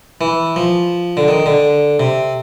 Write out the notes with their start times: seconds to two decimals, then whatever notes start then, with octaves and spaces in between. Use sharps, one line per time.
0.21 E3
0.56 F3
1.17 D3
1.28 D#3
1.46 D3
2.00 C3